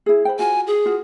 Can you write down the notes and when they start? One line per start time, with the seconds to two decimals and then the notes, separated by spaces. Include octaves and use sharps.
0.06 E4 G#4
0.25 B4 C5 G5
0.39 F4 F#4 G#5
0.67 G#4
0.86 F4 F#4